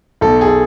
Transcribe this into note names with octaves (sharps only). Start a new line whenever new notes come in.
B1 B2 A4
G#4
A4